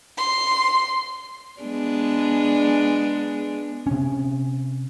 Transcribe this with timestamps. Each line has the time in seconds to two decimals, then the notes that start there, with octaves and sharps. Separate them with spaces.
0.18 C6
1.61 G#3 B3 D4
3.87 C3 C#4